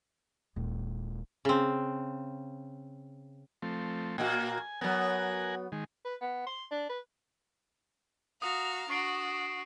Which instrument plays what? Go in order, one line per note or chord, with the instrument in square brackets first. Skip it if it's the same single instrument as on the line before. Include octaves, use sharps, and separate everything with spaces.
[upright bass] D#1 [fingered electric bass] A#2 G#3
[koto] C#3 C4
[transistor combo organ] F3 A3 C4
[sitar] A#2 A#3 F#4 [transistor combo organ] G#5
[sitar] F#3 B3 [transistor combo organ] A#4 F#5 G#5
[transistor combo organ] D#3 G#3
[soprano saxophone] B4
B3
C6
D4
B4
[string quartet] F#4 F5 A#5 [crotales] D#6
[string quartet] D4 F#4 [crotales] C#6 C7 D7